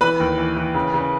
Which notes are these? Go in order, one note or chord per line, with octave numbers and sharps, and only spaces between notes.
E3 B4 B5
D#2
E3
E3
C#3
C#3